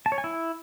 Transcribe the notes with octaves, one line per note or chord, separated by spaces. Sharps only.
A5
C#5
G#5
E4